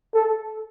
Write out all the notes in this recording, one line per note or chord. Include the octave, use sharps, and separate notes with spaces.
A4